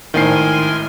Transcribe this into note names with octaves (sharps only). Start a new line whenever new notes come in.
G#1 A2 D#3 A#4 C5 G#5 C6 C7